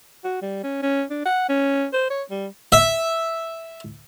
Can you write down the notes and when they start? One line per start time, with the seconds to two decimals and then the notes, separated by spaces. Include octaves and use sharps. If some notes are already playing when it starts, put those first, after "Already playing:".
0.25 F#4
0.42 G3
0.64 C#4
0.83 C#4
1.11 D4
1.26 F#5
1.49 C#4
1.93 C5
2.10 C#5
2.31 G3
2.72 E5